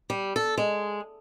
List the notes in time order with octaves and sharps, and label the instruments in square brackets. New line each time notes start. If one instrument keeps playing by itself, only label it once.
[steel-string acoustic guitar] G3
A4
G#3